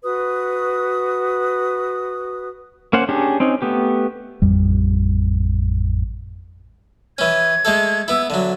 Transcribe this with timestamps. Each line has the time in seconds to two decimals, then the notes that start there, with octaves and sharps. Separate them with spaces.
0.03 F#4 B4 D#6
2.93 A#3 C#4 C5 F#5
3.09 C#4 D4 G4 G#4
3.40 C4 C#4 D#4
3.62 A3 B3 G4
4.42 A1 F2 G3
7.18 E3 C#4 G#6
7.65 G#3 A3 A4
8.08 B3 E4 E6
8.30 D3 F#3 E5